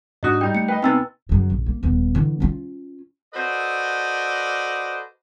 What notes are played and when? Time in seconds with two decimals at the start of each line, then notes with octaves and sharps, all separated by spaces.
0.23 G#2 D4 D#4 F#4 D#5 D#6
0.41 G3 D#4 G5
0.55 A3 C#7
0.68 B4 D#5 G5
0.82 C3 B3 D#4 G5 G#5 E6 A6
1.29 F#2 C#3
1.50 A#1
1.66 A#3
1.83 D#1 B3
2.15 D3 E3
2.40 C#4 F4
3.34 F#4 A4 B4 C5 D5 D#5